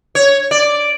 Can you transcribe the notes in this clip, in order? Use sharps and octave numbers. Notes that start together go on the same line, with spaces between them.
C#5
D5